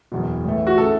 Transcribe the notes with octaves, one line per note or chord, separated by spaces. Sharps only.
F#1 E2 B2
A1 A2 E3 A3
F#4
C#3 A3 E4 A4